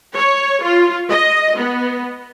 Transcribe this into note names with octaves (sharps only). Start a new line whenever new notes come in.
C#5
F4
D#5
B3